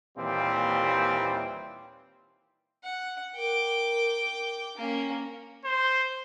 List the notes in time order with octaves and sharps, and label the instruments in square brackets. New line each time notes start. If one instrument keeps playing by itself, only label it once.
[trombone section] D#2 A#2 E3 G3 C4
[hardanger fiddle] F#5
[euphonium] A#4 [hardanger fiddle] G5 D6
[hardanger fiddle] A#3 C#4
[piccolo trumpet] C5